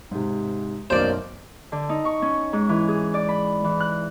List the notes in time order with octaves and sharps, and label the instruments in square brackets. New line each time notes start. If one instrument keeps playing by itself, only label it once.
[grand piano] G#2 C3
[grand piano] B1 F#2 A#3 [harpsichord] C5 D5
[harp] D3
D#4
C#6
C#4
G#2
E3
G#4
D5
B5
E3
F#6